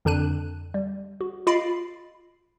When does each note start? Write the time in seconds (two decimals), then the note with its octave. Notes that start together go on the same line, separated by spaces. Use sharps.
0.05 F2 D3 D4 F#6 D#7
0.74 G3
1.21 F#4
1.47 F4 D#5 B5 A6 C7 D7